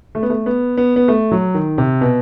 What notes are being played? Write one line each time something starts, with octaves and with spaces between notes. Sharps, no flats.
A3
B3
A3
B3
B3
B3
A3
F#3
D#3
C3
B2